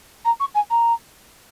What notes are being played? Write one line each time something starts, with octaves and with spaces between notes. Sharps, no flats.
A#5
C#6
G#5
A#5